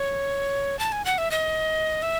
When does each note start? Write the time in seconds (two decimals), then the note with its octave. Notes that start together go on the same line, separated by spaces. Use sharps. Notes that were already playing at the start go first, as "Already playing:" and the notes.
Already playing: C#5
0.79 A5
0.92 G#5
1.05 F#5
1.18 E5
1.31 D#5
2.02 E5